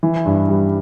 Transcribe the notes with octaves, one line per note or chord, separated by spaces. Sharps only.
E3
G2
G3